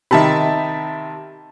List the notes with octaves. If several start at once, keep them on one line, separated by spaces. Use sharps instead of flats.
C3 D#3 E5 A5 B5